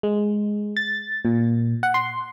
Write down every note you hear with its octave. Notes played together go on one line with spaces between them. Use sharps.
G#3
A6
A#2
F#5
C6